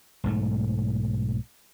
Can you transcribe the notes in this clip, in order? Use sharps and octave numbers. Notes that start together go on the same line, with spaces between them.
B1 G#2 A3